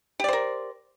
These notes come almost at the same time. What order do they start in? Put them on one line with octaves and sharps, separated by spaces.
G4 D5 C5 A#4